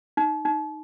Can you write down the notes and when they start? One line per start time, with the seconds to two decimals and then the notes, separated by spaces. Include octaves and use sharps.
0.17 D#4
0.45 D#4